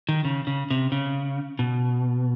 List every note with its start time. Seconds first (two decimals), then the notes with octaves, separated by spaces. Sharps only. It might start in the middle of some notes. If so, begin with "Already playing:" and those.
0.09 D#3
0.25 C#3
0.47 C#3
0.71 C3
0.92 C#3
1.59 B2